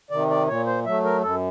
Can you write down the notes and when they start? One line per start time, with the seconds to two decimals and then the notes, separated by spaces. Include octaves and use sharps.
0.11 C3 D#3 D5
0.30 D5
0.48 A#2 C#5
0.66 C5
0.85 F#3 A3 E5
1.04 A#4
1.22 F#2 A4